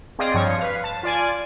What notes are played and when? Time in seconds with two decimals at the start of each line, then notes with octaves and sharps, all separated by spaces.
0.19 C4 G#4 D5 D#5 F5
0.34 G2 F3 C#5 C#7
0.59 B4 F5
0.84 A5
1.03 F4 D5 G#5